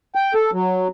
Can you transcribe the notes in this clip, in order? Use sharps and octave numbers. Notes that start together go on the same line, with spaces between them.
G5
A4
F#3